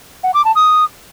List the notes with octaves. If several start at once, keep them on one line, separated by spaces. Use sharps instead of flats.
F#5
D6
A5
D#6